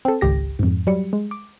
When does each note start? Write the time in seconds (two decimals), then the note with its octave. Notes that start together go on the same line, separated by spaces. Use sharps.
0.05 C4 A4
0.21 G#1 C#2 G4 A#6
0.59 F2 G#2
0.87 F#3 G3 C#7
1.13 G#3
1.31 D6